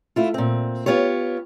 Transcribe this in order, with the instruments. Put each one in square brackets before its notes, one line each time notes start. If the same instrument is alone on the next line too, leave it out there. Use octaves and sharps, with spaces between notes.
[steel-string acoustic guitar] A3 E4 F4
A#2 C4
B3 F4 G4 C#5